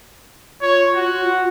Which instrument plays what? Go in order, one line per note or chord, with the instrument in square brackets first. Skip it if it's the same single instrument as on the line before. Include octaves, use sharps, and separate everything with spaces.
[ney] F4 [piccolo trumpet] C#5
[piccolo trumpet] F#4